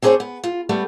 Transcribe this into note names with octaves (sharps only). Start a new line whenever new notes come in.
C4 D4 G#4 A#4 C5 C#5
B3
F4
G3 A3 B3